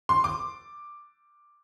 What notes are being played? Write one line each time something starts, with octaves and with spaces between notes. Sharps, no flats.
C6
D6